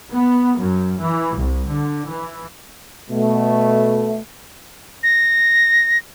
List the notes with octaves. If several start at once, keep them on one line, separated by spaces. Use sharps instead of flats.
B3
F#2
E3
C2
D3
E3
B2 A3
A#6